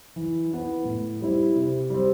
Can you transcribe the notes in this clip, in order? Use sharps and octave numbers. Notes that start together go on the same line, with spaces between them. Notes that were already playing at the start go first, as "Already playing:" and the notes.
E3
B3 E4
A2
G3 C4 E4
C3
G3 C4